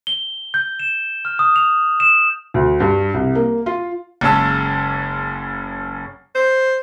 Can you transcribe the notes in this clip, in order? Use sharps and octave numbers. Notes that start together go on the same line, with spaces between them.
G7
G6
E7
F6
D#6
F7
E7
D2
G2
C2
A#3
F4
F#1 C#3 G#3 C#4 A5 E6
C5